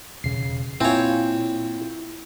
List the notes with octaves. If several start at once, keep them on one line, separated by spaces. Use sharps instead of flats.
E1 C#3 C7
A#2 C4 E4 F4 C#5 G#5